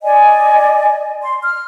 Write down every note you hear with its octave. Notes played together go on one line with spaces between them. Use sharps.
D5 D#5 G#5
C6
F6